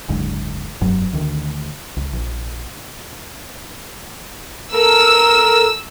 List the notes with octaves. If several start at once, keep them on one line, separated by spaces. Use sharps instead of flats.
F#1 D2 G#2
F1 G2 F#3
D2 D#3
C#2
A#1
A4 A#4 E6